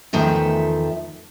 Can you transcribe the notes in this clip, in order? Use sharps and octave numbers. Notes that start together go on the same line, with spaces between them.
E2 D#3 F3 A3 E5